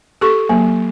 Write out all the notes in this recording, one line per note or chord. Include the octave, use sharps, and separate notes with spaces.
G4 A4 C#6
F#3 A#3